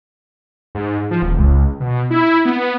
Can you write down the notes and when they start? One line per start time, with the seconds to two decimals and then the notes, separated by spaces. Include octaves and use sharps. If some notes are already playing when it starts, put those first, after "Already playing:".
0.75 G#2
1.11 F3
1.22 D#1
1.38 C#2
1.80 B2
2.11 E4
2.45 B3